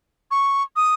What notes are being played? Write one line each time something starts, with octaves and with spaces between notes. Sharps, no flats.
C#6
D#6